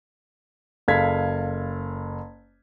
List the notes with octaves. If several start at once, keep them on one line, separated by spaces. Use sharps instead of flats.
F#1 A4 F5 G#6 B6